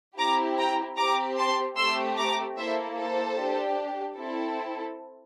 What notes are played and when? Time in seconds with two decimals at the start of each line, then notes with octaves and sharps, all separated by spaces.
0.18 C4 E4 G4 A#5 D6
0.58 G5 A#5
0.98 C4 G4 A#5 D6
1.38 A5 C6
1.77 A3 C4 G4 C6 E6
2.18 A#5 D6
2.57 A#3 E4 A4 C5 E5
2.97 A4 C5
3.38 D4 G4
4.17 C4 E4 A4